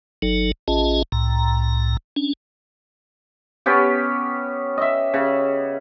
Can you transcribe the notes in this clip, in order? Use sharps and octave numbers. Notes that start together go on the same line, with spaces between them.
G1 F#3 D#4 A4
A1 C#4 F4 G#4 D#5 A5
C2 A2 A#5
C#4 D4
B3 C#4 G4
D#5 E5
C#3